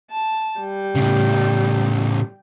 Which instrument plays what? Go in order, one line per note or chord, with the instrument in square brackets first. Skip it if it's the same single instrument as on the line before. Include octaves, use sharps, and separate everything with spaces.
[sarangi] A5
G3
[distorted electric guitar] A2 C#3